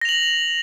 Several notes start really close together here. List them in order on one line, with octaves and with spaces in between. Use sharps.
A#6 F7 F#7